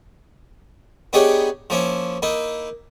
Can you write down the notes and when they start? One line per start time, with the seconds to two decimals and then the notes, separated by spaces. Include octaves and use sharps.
1.13 B3 D4 D#4 G4 G#4 C#5
1.70 F3 A#3 C#4 E4
2.22 A#3 D#4 E4